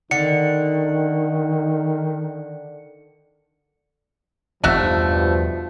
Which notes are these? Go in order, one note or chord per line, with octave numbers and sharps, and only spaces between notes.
D3 D#3 D#4 C#7
E2 G2 B2 F3 A3 D#4 F#4 E5